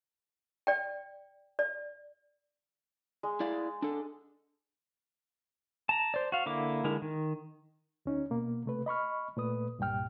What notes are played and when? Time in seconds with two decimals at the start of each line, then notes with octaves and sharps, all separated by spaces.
0.67 D5 G5
1.59 D5
3.23 G#3
3.40 E4 D5 F5
3.82 D4 A4
5.89 A5 A#5
6.14 C5 D5
6.32 F#4 F5
6.46 D3 A#3 E4 D6
6.84 D3 G#3 E4 A#4
7.02 D#3
8.06 D2 C#4 D#4
8.30 B2 A#3
8.66 C3 A3 B4
8.86 D#5 B5 C#6 F6
9.37 A#2 A3 B4 D#6
9.79 C2 G2 A#2 G3 G5 F6